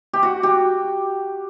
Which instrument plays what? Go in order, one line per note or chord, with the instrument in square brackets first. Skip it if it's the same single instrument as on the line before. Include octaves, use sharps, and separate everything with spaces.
[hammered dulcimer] G4
F#4
G4